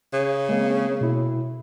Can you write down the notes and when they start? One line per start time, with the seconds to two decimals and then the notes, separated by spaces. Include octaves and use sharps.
0.13 C#3
0.49 G#3 A#3 C4
1.01 B2 E4